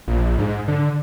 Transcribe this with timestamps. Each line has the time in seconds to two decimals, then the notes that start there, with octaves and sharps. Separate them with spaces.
0.08 A#1
0.38 G#2
0.68 D3